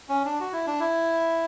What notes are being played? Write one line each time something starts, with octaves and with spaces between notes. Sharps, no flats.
C#4
D4
F#4
E4
D4
E4